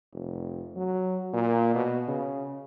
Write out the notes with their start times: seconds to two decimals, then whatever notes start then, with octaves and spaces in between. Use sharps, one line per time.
0.13 F1
0.76 F#3
1.33 A#2
1.75 B2
2.08 C#3